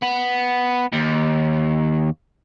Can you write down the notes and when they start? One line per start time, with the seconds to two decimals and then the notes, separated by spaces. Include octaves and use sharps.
0.03 B3
0.93 D#2